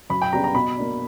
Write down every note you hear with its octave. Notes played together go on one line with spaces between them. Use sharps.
F#2 B5
G5
C#3 G3 B3 D4 A#5
A#5
B2 B5
A#3 D4